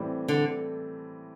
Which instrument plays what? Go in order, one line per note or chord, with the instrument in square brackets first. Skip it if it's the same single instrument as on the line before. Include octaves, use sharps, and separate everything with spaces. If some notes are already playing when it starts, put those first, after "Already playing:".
Already playing: [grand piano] A2 E3 G3 C4
[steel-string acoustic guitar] D3